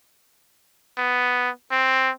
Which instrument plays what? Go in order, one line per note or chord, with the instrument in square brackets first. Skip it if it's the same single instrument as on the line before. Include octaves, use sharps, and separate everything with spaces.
[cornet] B3
C4